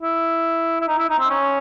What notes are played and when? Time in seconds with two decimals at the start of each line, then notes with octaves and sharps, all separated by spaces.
0.02 E4
0.81 E4
0.88 D#4
0.98 E4
1.09 D#4
1.19 C4
1.30 C#4